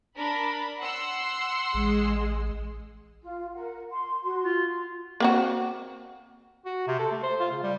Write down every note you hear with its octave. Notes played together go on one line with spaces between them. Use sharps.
D4 A#4 B5
F#5 C6 E6
A1 G#3
F4
A#4 F#5
C6
F#4 C6
F4
A#3 C4 F#4
F#4
C3
A4
A3
C5
F4
C#3
G3